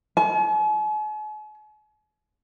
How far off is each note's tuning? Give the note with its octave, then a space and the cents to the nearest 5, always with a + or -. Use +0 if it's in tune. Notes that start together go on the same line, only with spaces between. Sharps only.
G#5 +45